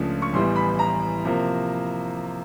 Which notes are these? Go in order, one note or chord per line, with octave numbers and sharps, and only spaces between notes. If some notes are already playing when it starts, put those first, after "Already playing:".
Already playing: C#2 C#3 F3 A3 D4
C#6
A1 A2 E3 G3 B3 C6
B5
A#5
C3 F3 A#3